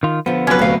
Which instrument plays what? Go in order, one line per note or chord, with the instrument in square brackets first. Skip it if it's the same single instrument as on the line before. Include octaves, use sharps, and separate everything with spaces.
[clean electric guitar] D#3 F4
[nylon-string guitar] D3 F3 [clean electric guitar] B3
[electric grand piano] C3 F#3 [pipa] C#4 B4
[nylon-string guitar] D2 F5